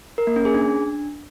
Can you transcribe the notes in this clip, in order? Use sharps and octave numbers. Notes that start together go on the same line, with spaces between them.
A#4
A#3
C#4
G#4
D4